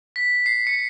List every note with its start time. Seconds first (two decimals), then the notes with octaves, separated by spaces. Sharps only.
0.16 B6
0.46 C7
0.67 C#7